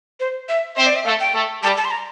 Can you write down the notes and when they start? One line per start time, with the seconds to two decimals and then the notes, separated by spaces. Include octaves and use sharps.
0.20 C5
0.49 E5
0.77 C4 C5 E5
0.86 D5
0.96 E5
1.05 A3 A4 F5
1.20 G5
1.34 A3 A4
1.63 G3 G4 A5
1.77 A5
1.85 C6
1.91 A#5